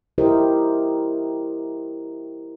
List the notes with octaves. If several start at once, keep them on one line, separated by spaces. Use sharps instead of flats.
E4 G4 A#4 C5 D#5